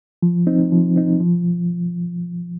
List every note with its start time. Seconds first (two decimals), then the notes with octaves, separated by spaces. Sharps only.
0.22 F3
0.47 C4 D#4
0.72 F3
0.96 C4 D#4
1.20 F3